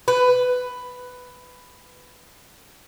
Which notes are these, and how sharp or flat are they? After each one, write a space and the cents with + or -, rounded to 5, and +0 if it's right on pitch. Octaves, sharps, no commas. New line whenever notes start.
B4 +10